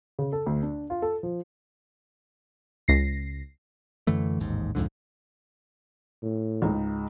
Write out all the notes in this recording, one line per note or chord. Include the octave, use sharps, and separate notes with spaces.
C#3
A4
D2
D4
F4
A4
F3
C#2 A#6 C7
F#2 D3 E3 A3
A1 D#2 G#2
C2 F2 G#2 D3
A2
C#2 G#2 D#4